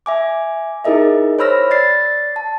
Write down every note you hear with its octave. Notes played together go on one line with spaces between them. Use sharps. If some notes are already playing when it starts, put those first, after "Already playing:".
E5 G#5 D6
D#4 E4 G#4 A#4 D#5 E5
C5 C#5 B5 E6 F6 A#6
D5 A6 C7
A5